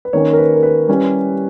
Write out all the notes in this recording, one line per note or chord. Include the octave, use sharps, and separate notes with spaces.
B4
D#3 A#3 C#4 C#5
A#4
B4
A#4
B4
G3 C#4 E4